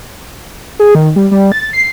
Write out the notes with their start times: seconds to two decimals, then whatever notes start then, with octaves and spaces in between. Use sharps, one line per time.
0.79 G#4
0.95 D#3
1.16 G3
1.31 G3
1.52 A6
1.73 C7